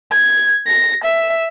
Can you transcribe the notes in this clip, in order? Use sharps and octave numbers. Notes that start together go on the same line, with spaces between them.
G#6
A#6
E5